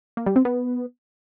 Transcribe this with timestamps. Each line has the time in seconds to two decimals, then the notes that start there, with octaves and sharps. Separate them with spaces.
0.17 A#3
0.26 G3
0.36 C4
0.45 B3